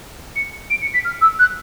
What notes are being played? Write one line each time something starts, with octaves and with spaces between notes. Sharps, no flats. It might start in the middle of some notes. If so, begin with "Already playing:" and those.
C#7
D7
C#7
B6
F6
E6
F#6